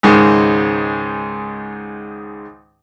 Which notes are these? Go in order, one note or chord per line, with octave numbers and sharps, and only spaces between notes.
C#2 G#2 D#3 G#3